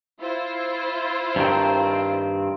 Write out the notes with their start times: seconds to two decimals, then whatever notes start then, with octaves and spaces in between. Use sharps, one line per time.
0.21 E4 F4 C5
1.36 G2 D#3 C4